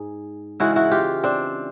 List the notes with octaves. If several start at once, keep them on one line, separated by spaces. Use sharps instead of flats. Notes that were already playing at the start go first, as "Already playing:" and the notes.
Already playing: G#2 G#4
C#3 E3 G#3 E4 F#4
E4 F#4
F4 G4
C4 D4